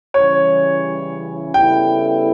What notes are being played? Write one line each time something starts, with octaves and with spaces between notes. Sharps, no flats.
C#3 E3 G3 C#4 E4 C#5
C#3 G3 B3 E4 A4 G5